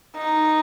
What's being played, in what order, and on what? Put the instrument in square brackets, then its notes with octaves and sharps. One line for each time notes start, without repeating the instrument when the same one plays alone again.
[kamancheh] D#4